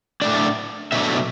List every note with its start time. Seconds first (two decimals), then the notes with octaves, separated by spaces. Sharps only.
0.21 A2 A3 D4 D5
0.92 B2 F#3 A3 D4 E5